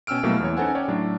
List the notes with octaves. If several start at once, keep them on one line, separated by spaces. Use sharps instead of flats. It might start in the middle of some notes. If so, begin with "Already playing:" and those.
B2 C#4 G5 E6 F6 D7
B2 F#3 G3 A3 A#3 E4
E2 E3 C#5
C#4 D#4 A4 C5 F#5 G#5
C#4 C#5 D5 G5
A2 F#3 D4